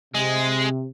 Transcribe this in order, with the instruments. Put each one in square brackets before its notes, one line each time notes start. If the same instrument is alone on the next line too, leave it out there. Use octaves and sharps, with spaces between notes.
[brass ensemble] C3 [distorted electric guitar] G#3